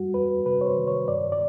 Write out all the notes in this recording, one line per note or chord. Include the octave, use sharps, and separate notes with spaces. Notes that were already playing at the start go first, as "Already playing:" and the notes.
Already playing: G3 F#4
E2 B4
C3 B4
C#5
C5
D#3
C#5
G2 D5
D5